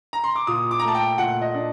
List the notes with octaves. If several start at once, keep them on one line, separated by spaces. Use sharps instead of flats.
A#5
C6
D6
A#2 D#6
D6
A#5
A3
A5
G5
A#2 F#5
D#5
D4